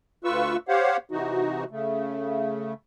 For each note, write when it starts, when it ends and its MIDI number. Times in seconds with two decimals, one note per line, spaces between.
0.24 0.57 38
0.24 0.57 65
0.24 0.57 71
0.24 0.57 85
0.24 0.57 88
0.68 0.97 67
0.68 0.97 72
0.68 0.97 73
0.68 0.97 77
0.68 0.97 78
1.11 1.64 48
1.11 1.64 52
1.11 1.64 63
1.11 1.64 66
1.71 2.73 49
1.71 2.73 57